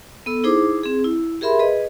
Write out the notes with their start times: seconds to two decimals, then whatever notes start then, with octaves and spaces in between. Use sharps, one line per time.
0.26 B3 A4 E6
0.44 D#4 E4 G#4 C5 D6
0.83 C4 G#4
1.04 E4
1.41 G4 G#4 A#4 E5 B5 C6
1.59 G#4 B4 D#5